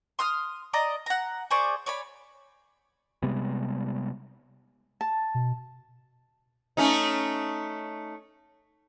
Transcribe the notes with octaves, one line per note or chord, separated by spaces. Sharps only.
C6 D#6 F6
D5 D#5 A#5
F#5 A#5
G#4 C5 D5 C#6
C#5 D5 G#5 B5
C3 G3 G#3 B3
A5
B2
A3 C#4 D#4